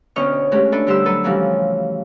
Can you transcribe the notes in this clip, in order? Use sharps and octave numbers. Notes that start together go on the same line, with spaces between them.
D2 B2 C#4 D#5 C#6 F6
G#3 A3 C#4 F#4 G4
D4 A4 B4 E5
D3 G3 G4 C5 F#5 E6
F#3 A4 B4
C#3 E3 F3 G3 C4 F#4